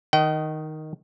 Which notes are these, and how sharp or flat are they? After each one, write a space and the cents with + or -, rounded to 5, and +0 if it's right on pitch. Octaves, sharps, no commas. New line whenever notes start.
D#3 +0 D#5 +0 G5 -40